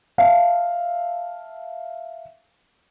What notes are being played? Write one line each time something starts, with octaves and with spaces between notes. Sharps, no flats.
E5 F5 A5